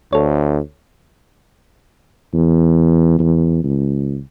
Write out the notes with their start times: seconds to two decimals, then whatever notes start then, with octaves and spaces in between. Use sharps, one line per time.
0.13 D2 A4 C#5
2.34 E2
3.19 E2
3.64 C#2